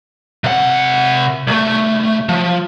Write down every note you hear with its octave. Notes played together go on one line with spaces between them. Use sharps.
C3 F#5
C2 A3
F3